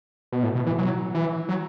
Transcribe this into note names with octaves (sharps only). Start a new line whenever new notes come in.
B2
A2
B2
E3
F#3
E3
F#3